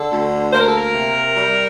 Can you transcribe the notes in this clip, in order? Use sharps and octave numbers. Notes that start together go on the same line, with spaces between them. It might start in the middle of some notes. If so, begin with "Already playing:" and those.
Already playing: D3 A4
D2
A#3 C5
A#4
A4
A#4
C3
G3